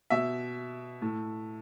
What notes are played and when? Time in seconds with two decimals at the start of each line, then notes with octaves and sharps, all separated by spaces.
0.10 B2 E5
1.02 A2